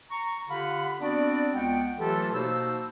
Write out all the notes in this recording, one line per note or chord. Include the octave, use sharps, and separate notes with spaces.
A#5 C#6
D3 F4 G4 F5 F#5 B5
B3 C4 D4 F#4 D5
C#2 G#3 B3 F#5 G5
E3 F#3 A3 F4 G4 A4
B2 A#3 D#4 C5 A5 E6